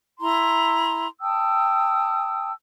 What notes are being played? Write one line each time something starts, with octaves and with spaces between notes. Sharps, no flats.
E4 A#5 C6
G5 A5 D#6 E6